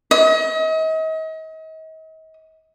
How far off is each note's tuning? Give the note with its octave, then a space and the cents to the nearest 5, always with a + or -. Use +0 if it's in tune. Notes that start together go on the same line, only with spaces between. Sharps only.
D#5 +40